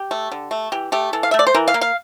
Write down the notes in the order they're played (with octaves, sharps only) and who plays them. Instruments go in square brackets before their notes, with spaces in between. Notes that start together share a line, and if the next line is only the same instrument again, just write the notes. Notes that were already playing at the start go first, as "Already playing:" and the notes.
Already playing: [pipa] G4
A3
D3
A3
E3 G4
A3 G4
E3 A4
F5
E5
A3
D5
C5
E3 A#4
F5
A#3
F5